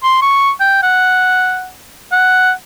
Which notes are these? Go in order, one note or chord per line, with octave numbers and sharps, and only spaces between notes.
C6
C#6
G5
F#5
F#5